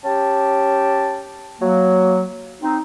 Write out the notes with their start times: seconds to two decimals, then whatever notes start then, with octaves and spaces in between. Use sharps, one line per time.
0.03 C#4 G4 G5 A5
1.60 F#3 A#3
2.62 C4 D#4